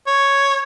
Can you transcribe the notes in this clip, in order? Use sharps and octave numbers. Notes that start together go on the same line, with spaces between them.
C#5